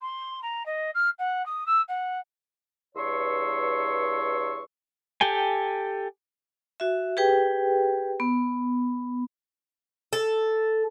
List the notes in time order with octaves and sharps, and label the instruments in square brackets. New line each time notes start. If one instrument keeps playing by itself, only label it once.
[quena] C6
A#5
D#5
F6
F#5
D#6
E6
F#5
[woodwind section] E2 G2 C#5 C6 C#6 E6
[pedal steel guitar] G4 A4 G5 G#5
[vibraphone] F#4 E5
G4 G#4 B4 G5
B3
[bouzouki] A4